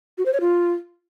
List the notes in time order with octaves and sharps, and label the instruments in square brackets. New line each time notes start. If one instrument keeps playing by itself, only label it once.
[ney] F#4
C5
C#5
F4